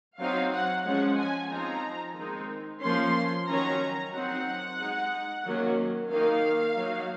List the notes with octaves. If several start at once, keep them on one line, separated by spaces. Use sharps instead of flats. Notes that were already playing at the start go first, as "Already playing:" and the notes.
F#3 C4 D#4 F5
F#5
F3 G#3 C#4 F#5
G#5
F3 C4 D#4 A#5
D#3 G#3 C4 D#4
F3 A#3 C#4 C6
D#3 F#3 C#4 A#5
F#3 C4 D#4 F#5
G#3 D#4
D#3 F#3 A#3 C#4
D#3 A#3 D#4 F5
F#3 A#3 D#4